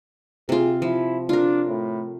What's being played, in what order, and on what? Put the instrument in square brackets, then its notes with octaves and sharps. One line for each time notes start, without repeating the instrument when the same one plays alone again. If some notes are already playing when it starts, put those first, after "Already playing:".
[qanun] C3 F4 [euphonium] G#4
[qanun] F3 [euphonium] E4
[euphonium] D4 [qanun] F4 A#4
[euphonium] A2